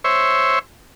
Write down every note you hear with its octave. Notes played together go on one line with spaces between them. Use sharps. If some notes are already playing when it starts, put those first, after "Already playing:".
C5 C#5 E5